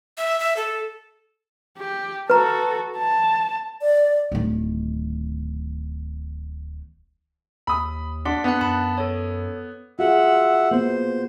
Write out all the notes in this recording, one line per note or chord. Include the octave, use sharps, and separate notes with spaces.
E5
E5
A4
G4
F#4 A4 B4 A#5
A5
D5
D1 D#3
D#2 B5 D#6
D4 F#5 C6 B6
F2 B3 D4 F#5 F#6
F#2 A5 B5
A4 C#5
F4 F#4 G#4 E5 F#5
A#3 B3 C5